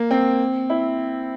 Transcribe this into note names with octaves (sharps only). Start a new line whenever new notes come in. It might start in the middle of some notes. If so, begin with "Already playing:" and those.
Already playing: A#3
C4
E4